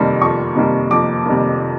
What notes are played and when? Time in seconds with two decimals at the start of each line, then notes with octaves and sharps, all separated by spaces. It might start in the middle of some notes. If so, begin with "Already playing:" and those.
Already playing: F2 C3 D#3 G3 A#3 C6
0.21 F2 C#6
0.55 C3 D#3 G3 A#3
0.91 F2 D6
1.26 C3 D#3 G3 A#3